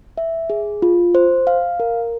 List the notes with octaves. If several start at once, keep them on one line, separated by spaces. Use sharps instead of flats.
E5
G#4
F4
C5
F5
A#4